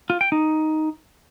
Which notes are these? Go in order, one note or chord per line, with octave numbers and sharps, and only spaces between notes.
F4
G5
D#4